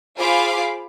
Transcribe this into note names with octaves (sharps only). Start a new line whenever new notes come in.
F4 G#4 C5 F5 B5 D6